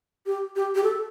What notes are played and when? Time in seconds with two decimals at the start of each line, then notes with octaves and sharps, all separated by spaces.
0.26 G4
0.56 G4
0.75 G4
0.83 A4